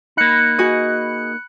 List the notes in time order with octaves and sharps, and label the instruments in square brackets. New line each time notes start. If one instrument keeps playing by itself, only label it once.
[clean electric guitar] A#3 D#4 [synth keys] B5 F#6 C#7
[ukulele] F#4 G#4 D#5